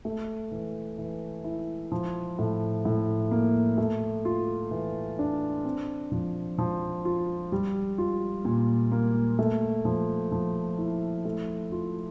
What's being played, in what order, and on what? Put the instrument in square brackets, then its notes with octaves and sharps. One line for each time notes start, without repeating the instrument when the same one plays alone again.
[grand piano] A3
E3
E3
E4
F3
A2
A2
A#3
A3
F4
E3
D4
C4
F3
F3
F4
G3
F4
A#2
A#3
A3
F3
F3
E4
A3
F4